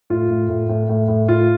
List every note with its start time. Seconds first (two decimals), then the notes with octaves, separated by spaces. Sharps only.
0.10 A2 F4
0.30 A2
0.49 A2
0.69 A2
0.89 A2
1.08 A2
1.28 A2 F4